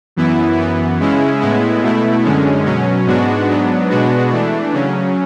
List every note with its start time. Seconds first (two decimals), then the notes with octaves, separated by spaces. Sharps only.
0.16 F#2 E3 B3 E4
0.58 F#2 E3 B3
1.00 C#3 G#3 C#4 E4
1.41 A2 G#3 B3 E4
1.83 B2 A3 E4
2.24 F#2 D3 G#3 C#4
2.65 B2 F#3 C#4
3.06 G#2 G#3 B3 D4 F#4
3.49 G#2 F#3 B3 D4
3.90 B2 G#3 B3 D4 F#4
4.31 E3 A3 D4
4.73 C#3 F#3 C#4